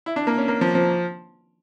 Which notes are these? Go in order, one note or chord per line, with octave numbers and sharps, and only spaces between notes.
E4
D4
A#3
C#4
A#3
F3
F3